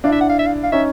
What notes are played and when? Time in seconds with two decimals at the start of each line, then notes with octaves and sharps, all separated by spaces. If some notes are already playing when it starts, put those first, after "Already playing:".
0.04 D4 E4 F5
0.12 E5
0.21 F#5
0.30 F5
0.39 E5
0.47 F5
0.63 F5
0.72 C#4 D#4 E5